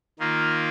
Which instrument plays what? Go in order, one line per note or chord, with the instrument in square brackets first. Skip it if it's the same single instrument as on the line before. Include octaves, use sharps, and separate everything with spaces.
[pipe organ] D#3 A#3 F4